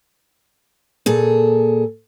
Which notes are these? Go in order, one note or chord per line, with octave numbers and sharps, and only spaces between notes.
A#2 G#4 A4